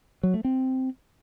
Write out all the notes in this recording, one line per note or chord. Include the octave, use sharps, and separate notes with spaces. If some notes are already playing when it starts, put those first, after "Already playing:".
F#3
A3
C4